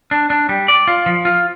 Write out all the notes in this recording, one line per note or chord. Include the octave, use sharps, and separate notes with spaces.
D4
D4
G3
D5
F4
F3
F4